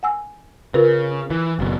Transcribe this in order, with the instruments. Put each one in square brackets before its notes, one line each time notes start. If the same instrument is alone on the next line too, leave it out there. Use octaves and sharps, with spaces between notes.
[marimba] F#5 G#5 E6
[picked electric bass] C#3 [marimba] F4 A#4 B4
[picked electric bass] E3
F#1 B2